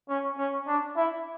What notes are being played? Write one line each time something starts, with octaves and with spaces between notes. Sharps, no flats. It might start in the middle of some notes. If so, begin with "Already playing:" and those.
C#4
C#4
D4
E4